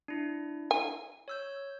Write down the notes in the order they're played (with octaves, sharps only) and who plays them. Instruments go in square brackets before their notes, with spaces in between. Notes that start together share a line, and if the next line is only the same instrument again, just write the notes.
[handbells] D4 E4
[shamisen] G#5
[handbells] C#5 E6 G6